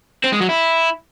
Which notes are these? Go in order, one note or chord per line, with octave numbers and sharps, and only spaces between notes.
C4
G#3
F#3
E4